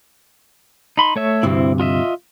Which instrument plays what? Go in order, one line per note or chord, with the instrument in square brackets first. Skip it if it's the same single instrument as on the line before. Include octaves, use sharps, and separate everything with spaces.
[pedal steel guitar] D#4 B5 C6
A3 C#5 E5
[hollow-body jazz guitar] D2 G2 C3 [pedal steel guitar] C4 E4
[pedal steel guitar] F4 D#5 E5